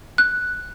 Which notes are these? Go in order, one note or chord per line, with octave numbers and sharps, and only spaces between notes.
F#6